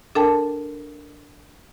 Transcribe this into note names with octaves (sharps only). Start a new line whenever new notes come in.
D4 A4 A#4 G5 A5